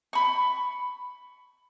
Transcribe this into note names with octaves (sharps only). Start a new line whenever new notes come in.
B5 C#6